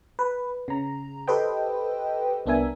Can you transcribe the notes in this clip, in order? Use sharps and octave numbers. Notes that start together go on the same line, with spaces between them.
B4
C#3 A#5
G4 A4 B4 C5 D#5 G5
C2 B3 D4 A#4 E5 G#5